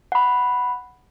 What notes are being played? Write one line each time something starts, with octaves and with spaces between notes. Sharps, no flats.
F#5 B5